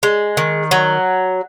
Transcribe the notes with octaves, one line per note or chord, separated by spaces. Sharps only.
G#3
D#3
F#3